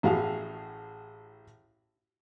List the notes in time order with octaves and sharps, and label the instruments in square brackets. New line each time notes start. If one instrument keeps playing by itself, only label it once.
[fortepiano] A1 A2 F#4 G#4 F5